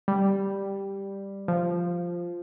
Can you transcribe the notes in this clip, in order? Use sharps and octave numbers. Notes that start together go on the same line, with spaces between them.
G3
F3